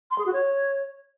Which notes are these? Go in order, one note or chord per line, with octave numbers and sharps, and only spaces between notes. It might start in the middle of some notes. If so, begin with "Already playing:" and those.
C6
G#4
F#4
C#5